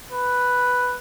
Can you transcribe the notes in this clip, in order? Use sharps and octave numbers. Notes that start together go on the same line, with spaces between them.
B4